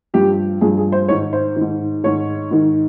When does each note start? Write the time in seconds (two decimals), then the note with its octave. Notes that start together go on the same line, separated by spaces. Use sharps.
0.14 G2 F3 G4
0.61 G2 F3 G#4
0.77 G#4
0.92 C5
1.08 G#2 D#3 C#5
1.33 C5
1.56 G#2 D#3
2.04 G#2 D#3 C#5
2.51 G#2 D#3